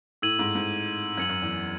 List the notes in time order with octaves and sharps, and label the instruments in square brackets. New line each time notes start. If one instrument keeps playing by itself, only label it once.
[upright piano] A2 [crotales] E6 G#6 D#7 F#7
[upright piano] G#2
G#2
[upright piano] F#2 [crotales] G#6 C#7 F#7
[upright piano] F#2
E2